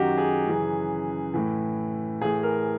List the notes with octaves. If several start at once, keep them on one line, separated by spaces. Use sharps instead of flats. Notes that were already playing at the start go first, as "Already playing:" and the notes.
Already playing: F#2 D#3 F#4 G4
G#4
F#2 C#3 E3
A2 E3
A2 E3 G#4
A#4